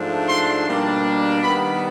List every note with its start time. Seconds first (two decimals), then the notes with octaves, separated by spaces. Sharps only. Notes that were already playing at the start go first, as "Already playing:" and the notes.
Already playing: G#2 F3 A3 D4
0.28 C6
0.66 B2 G3 A#3 D4
1.42 D#3 G3 B3 B5